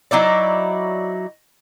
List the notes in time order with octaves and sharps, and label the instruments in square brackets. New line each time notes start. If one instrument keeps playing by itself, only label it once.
[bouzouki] F#3 D#4 E4 D5